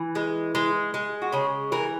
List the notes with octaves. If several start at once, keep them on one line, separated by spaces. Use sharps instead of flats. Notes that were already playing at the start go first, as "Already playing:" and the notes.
Already playing: E3
G#3
G#3
G#3
F#4
C#3 G#4
E3 A#4